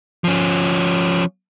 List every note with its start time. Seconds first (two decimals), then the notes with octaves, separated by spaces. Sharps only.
0.24 F3 C#4